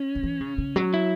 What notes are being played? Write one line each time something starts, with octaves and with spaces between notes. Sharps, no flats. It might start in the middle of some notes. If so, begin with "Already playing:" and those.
Already playing: C#4
C#3
E3
C#3
C#3
F#3
E4